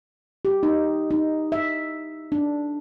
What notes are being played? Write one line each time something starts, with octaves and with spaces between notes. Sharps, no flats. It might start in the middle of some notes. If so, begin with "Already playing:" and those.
G4
D#4
D#4
E5
D4